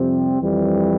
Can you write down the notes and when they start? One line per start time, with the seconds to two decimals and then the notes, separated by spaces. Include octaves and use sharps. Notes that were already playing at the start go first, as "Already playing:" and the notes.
Already playing: F2 C3 G3 C4
0.40 F2 E3 G3